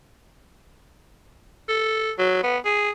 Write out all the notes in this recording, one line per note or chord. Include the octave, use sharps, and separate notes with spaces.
A4
F#3
B3
G#4